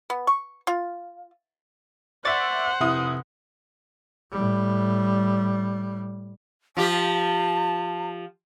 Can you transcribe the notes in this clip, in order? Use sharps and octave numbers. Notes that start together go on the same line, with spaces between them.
B3
C#6
F4
C5 D5 E5 F#5 C#6 A6
F1 C3 E4 D#6
A2 G3
F3 F4 G4 A5